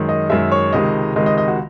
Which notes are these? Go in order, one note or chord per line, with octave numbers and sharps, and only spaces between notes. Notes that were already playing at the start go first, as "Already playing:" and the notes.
Already playing: F#2 D#3 G#3
D#5
F#2 D#3 G#3 E5
C#5
C#2 C3 D#3 G#3 D#5
C#2 C3 D#3 G#3 D#5
D#5
D#5
F#4